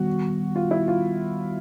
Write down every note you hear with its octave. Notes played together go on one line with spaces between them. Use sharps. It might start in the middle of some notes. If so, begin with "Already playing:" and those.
Already playing: D#3 G3 B3 F#4
F4
E4
F4